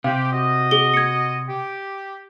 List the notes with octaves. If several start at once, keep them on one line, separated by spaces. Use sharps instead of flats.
C3 G4 F5
F#4 D#5
G#4 G7
G#6 C#7
G4